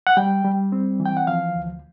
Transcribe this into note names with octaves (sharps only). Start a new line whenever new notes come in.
F#5
G3 G5
G3
C4
E3
G5
F#5
F3 F5
D2